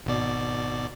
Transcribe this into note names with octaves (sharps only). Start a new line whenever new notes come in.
G#1 B2 D5